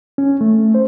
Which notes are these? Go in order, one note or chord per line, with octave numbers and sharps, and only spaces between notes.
C#4
A3
C5